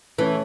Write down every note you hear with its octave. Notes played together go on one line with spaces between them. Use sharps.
E3 A3 C#4